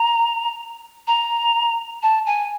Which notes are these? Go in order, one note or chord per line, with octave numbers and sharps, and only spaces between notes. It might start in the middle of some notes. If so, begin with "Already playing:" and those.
Already playing: A#5
A#5
A5
G#5